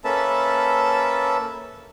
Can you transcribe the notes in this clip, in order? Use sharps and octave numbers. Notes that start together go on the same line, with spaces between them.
A#3 C#4 A4 B4 E5 A5